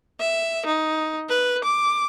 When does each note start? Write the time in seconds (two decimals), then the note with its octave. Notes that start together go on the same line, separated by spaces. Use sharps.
0.20 E5
0.66 D#4
1.29 B4
1.64 D6